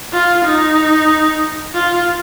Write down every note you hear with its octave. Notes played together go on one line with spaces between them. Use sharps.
F4
D#4
F4